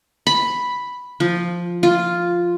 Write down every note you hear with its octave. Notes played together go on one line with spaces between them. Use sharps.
B5
F3
F4